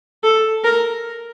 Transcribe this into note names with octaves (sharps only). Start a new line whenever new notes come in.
A4
A#4